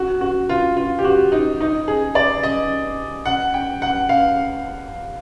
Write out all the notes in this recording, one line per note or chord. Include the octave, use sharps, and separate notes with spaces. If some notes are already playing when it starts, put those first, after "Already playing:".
Already playing: F#4
F#4
F4
F4
G4
F#4
D#4
D#4
G#4
D5
D#5
F#5
G5
F#5
F5